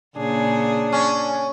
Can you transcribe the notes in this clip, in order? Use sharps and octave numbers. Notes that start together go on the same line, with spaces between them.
A#2 C#3 D4 G#4
C#4